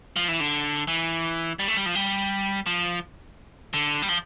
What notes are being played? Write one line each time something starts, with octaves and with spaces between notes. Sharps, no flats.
F3
E3
D3
E3
G3
A3
G3
F3
G3
F3
D3
G3
F3